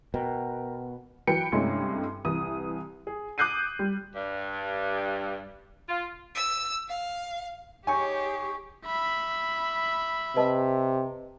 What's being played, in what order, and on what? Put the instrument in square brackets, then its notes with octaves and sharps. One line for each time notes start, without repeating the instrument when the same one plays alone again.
[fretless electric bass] B2 [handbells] A#4 G5 A#5
[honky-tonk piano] E3 F#3 B4 G5 C#7
G2 C3 G#3 A3 C#4 E4
C2 E3 D#6
G#4
D6 D#6 F#6 G6 C7 D#7
G3
[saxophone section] G2
F4
[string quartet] E6
F5
[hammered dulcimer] D#4 C#5 [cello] G4 G#4 [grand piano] G#5 C#6
[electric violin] E5 B5
[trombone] C3 [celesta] B4 D#5 A5